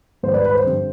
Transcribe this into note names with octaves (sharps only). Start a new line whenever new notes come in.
G#2 D#3 G3 C5
B4 D5
B4
C5
G2 D3 G3 C4